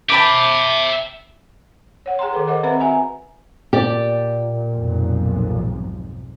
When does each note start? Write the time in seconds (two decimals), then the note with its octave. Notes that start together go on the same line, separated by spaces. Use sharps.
0.10 E5 G5 A5 B5 D6
2.06 C#5 F#5
2.19 G#4 G5 A#5 C6
2.33 D#3 A4 B4
2.47 A#4 C5 D#5 F#5 D6
2.63 C4 B4 E5 F#5 B5
2.80 F#4 E5 G#5 A#5
3.73 A#2 G4 D5
4.74 B1 F2 G#2